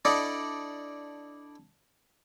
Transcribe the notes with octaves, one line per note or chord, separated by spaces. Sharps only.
D4 E4 A4 D5 D#5 F#5